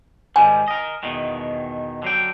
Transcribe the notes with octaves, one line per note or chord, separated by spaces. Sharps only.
G#2 D#3 G3 G#5
A#4 D#5
E2 B2 D#3
D3 F#3 G5